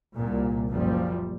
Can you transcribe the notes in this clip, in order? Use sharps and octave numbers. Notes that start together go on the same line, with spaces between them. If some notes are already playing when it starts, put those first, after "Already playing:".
C2 A#2
F#1 A#2 F3 G3